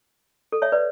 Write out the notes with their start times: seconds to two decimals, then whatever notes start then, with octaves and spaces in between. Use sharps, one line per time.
0.52 A4
0.62 C#5 E5
0.72 B4 D5